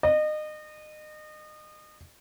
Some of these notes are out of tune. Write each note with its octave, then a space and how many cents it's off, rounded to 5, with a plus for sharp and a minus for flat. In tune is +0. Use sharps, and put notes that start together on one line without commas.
D#5 -30